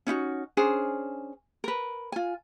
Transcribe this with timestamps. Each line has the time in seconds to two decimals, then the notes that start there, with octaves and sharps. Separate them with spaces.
0.07 C#4 D#4 E4 F#4
0.57 C#4 D4 G#4 C5
1.64 A#4 B4
2.12 F4 G#5